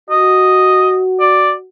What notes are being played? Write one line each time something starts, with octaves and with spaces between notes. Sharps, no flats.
F#4 D#5
D5